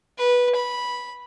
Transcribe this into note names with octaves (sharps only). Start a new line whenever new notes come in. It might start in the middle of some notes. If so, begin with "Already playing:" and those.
B4
B5